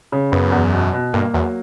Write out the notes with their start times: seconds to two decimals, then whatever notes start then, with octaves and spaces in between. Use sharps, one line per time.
0.12 C#3
0.32 F#2 B3
0.52 E2
0.73 B2
0.93 B2
1.13 G2 A#3
1.33 E2 F#3